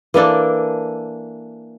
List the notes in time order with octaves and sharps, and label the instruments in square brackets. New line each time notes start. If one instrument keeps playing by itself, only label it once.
[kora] E3 A#3 D4 A4